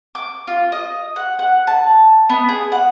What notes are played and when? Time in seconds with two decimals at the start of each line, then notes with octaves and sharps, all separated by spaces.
0.15 D6
0.47 F4
0.72 D#5
1.16 F#5
1.39 F#5
1.67 A5
2.29 B3
2.49 G#4
2.72 F#5